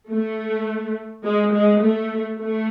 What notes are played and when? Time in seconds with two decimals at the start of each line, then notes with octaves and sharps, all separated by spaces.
0.11 A3
1.24 G#3
1.53 G#3
1.81 A3
2.38 A3